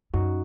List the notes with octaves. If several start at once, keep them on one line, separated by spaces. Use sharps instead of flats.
F#2 D#4 F#4